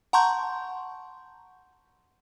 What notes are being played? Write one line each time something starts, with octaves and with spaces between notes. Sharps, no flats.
F#5 A5 A#5 C6 C#6 G6